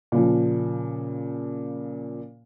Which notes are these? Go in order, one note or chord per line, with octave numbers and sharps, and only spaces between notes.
A#2 C#3 F3